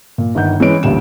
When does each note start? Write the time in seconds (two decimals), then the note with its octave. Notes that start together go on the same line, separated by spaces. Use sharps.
0.18 A#2
0.35 G1 D#3 F#5 G6
0.60 E3 G#3 C#4 B4 C#5 D7
0.83 A1 D2 A#2 G3 E7